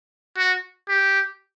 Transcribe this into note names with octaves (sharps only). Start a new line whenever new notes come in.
F#4
G4